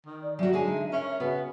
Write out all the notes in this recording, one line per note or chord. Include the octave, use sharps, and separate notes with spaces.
D#3
D5
F#3 G3 F#4 E5
D3 G#3 D#4 G#5
C#4 A#4
C#3 B3 F#4